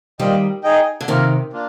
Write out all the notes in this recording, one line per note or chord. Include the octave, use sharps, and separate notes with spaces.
D#3 G3 A#3 F4 C5 D#5 G5
D#4 G#4 D#5 G5
D3
C3 D#3 A#3 F4 A#4
A#3 D4 F4